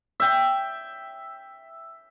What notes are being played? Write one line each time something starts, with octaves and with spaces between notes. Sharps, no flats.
E5 G5